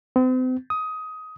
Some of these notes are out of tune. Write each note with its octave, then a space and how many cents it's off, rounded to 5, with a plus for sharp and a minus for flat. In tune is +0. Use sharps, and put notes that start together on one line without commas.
C4 -40
D#6 +15